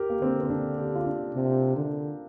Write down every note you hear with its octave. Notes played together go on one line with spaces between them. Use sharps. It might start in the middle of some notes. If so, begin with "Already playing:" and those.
Already playing: G4 A#4
A#3
D3 C4
C4
D4
G4
F4
D4
C3
D3